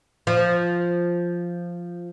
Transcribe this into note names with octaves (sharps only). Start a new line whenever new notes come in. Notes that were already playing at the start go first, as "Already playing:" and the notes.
F3